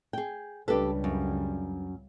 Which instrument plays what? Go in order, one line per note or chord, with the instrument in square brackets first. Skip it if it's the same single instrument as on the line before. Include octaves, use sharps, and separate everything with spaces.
[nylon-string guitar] G#4 G5
[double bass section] C#2 C#3 G3 [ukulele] D4 B4 [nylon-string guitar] G4 A4
[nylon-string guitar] F#2